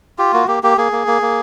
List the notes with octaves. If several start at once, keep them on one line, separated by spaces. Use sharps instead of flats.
F4 G4
A#3 F#4
A#3 G4
A#3 G4
A#3 G#4
A#3
A#3
A#3